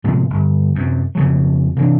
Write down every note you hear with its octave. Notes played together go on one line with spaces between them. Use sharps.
A2 C3 F3 G#3
G1
F#2 C3
F2 C#3 F#3
C3 E3 D4